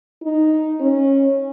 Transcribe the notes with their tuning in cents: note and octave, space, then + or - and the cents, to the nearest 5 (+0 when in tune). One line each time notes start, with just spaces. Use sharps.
D#4 +0
C#4 -20